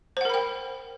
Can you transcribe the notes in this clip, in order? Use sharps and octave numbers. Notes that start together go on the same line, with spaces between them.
A#4 C5 F#5 G5 B5